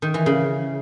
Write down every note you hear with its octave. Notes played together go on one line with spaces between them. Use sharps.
D#3
E3
C#3